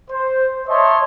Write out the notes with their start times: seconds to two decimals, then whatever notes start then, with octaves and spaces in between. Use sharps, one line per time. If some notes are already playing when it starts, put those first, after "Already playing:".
0.11 C5
0.67 C5 C#5 D#5 E5 A5 C6